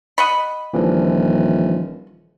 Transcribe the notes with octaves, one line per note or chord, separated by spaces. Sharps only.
D#5 F#5 B5
D#1 E3 F3 D4